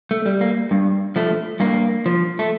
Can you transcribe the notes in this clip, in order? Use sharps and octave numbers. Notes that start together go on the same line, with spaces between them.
A3
G3
A#3
G2
F3 A3
G2 A#3
F3
A3